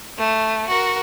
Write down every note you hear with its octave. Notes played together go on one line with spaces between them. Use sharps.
A3
F#4 A#4